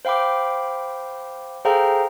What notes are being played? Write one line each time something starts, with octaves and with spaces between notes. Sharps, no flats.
C5 F5 G5 B5 D6
G#4 A4 C5 F5 G5 A#5